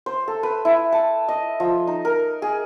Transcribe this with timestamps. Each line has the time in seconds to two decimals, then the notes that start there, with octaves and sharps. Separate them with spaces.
0.06 C5
0.28 A4
0.43 B4
0.65 E4
0.92 A5
1.28 D#5
1.60 F3
1.87 D#4
2.05 A#4
2.42 G#4